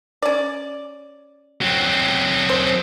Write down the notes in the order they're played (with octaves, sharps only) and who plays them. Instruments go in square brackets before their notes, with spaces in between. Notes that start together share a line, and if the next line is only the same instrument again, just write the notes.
[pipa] C#4 D5
[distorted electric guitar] F#3 C4
[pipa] C5